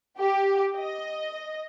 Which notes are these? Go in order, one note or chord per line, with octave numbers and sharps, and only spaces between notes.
G4
D#5